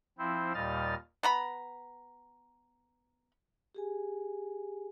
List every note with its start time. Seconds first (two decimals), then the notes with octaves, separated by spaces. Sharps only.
0.19 F3 C4 E4 C5
0.54 D#2 A#2 G3 D#5 F6 A6
1.23 B3 A#5 B5
3.75 G4 G#4 G#5